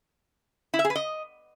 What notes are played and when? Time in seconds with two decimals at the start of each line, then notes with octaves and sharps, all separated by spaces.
0.74 E4
0.79 E5
0.85 G#4
0.90 B4
0.95 D#5